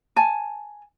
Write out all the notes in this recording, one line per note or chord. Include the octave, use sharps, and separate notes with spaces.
G#5 A5